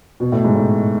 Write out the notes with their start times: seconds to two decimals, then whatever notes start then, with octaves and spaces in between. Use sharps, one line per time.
0.20 B2
0.32 A2
0.44 G#2
0.55 A2